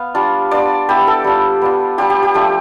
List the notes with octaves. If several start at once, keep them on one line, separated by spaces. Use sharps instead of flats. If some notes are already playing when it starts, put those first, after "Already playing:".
Already playing: B3 F5
G3 D4 F4
B3 D4 F4 D5
B3 E4 G4
A4
G3 D4 F4
B3 D4 F4
G3 D4 F4 G4
G4
G4
F3 A3 D4 F4 G4